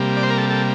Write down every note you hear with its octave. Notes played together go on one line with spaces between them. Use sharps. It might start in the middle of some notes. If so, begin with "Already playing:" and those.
Already playing: C3 G3 A#3
D5
C5
A#4
A4
A4